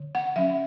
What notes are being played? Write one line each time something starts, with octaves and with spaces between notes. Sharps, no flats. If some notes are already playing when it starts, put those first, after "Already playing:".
Already playing: D3
F#5
F#3 C#4 E5